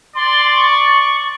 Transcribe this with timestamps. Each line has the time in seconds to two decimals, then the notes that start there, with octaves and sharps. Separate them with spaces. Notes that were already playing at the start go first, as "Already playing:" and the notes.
0.15 D5 C6
0.56 C#6